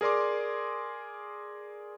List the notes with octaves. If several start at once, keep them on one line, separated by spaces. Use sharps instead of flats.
G#4 A#4 D5 C6 D6